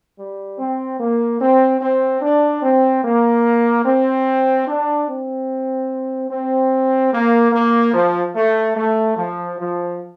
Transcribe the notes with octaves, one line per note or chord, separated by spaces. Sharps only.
G3
C4
A#3
C4
C4
D4
C4
A#3
C4
D4
C4
C4
A#3
A#3
F3
A3
A3
F3
F3